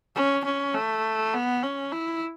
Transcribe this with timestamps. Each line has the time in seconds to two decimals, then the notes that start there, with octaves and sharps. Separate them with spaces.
0.16 C#4
0.45 C#4
0.74 A3
1.34 B3
1.63 C#4
1.92 E4